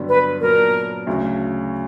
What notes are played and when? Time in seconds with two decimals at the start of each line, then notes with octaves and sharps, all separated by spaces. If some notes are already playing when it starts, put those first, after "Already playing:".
Already playing: G2 D3 F#3 B3
0.08 B4
0.40 A#2 F#3 B3 D4 A#4
1.07 D2 C#3 F#3